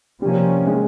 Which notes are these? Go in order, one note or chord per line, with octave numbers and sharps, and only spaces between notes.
C3 F3 G3 A#3 C#4
G#3